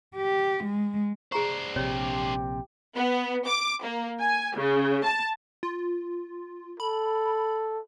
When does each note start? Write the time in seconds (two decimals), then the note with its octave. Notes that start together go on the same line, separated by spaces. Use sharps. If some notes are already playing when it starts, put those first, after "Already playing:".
0.16 G4
0.64 G#3
1.32 D4 G#4 C5 A#5 C#6
1.76 A#1 C3 G4 C#5
2.95 B3
3.46 D6
3.83 A#3
4.21 G#5
4.56 C#3
5.04 A5
5.63 F4
6.80 A4 B5